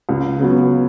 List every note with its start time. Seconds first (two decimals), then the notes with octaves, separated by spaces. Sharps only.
0.09 C#2
0.39 C#3 F#3 B3 F#4